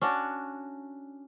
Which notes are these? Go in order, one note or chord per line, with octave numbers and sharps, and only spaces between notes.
C#4 D4 F#4 D5